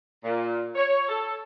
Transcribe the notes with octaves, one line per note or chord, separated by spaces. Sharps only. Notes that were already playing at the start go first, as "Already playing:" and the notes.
A#2
C#5
A4